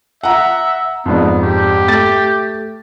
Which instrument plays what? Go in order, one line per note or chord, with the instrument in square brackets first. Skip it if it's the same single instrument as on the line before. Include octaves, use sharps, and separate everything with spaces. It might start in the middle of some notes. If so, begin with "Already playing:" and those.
[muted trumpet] E5 [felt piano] F#5 A#5
[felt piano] F2 G#2 D5 [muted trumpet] B3
[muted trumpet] G4
[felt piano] A3 A6